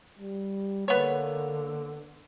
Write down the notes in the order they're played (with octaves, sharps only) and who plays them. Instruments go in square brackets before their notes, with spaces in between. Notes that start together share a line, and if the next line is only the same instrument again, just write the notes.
[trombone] G3
[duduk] D3 [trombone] A#3 [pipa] B3 C#5